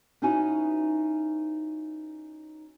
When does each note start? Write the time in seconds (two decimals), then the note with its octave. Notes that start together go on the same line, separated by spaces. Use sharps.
0.22 B3 C#4 D#4 E4 F#4 G#5